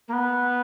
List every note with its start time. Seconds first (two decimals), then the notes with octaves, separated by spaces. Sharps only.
0.08 A#3
0.13 B3